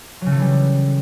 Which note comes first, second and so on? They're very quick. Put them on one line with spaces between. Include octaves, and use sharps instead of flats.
F#3 C#3 A3 E3 G3